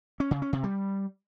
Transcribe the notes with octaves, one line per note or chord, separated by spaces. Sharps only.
C#4
C#3
C#4
C3
G3